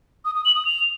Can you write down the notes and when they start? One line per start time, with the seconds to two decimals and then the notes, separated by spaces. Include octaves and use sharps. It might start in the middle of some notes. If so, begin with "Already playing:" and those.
0.25 D#6
0.35 D#6
0.45 F#7
0.55 D#6
0.65 F7